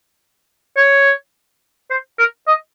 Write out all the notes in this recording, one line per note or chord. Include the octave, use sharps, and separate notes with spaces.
C#5
C5
A#4
D#5